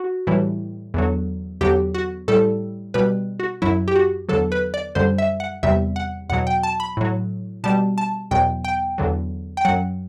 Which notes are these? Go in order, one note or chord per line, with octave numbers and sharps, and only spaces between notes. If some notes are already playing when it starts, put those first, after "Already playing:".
Already playing: F#4
A2 E3 G3
E2 D3 F#3
E2 D3 F#3 G4
F#4
A2 G3 A4
B2 G3 B4
F#4
F#2 F#3 E4
G4
F#4
E2 D3 F#3 A4
B4
D5
F#2 D3 G3 C5
E5
F#5
E2 C3 G3 E5
F#5
E2 B2 F#3 F#5
G5
A5
B5
A2 F#3
B2 G3 A5
A5
E2 B2 F#3 G5
G5
E2 D3 F#3
G5
F#2 F#3 F#5